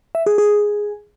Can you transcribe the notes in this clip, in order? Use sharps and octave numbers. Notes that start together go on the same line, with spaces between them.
E5
G#4
G#4